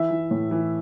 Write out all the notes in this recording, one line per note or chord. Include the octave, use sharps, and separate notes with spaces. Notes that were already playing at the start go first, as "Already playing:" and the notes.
Already playing: E3 E5
E3
A2
E3